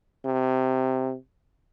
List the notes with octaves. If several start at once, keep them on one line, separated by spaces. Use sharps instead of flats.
C3